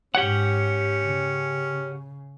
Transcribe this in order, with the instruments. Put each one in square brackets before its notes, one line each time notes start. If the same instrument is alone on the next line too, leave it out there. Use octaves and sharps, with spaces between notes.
[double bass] G#2 [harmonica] C#4 [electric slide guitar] G4 C#5 F#5
[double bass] C#3